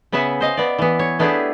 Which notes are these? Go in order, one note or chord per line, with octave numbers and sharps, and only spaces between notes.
C#3 B3 B4 E5 F#5 G#5
C5 D#5 F5
B3 D5
E3 B3
C#5
A3 B3 D4 E4 G4 G#4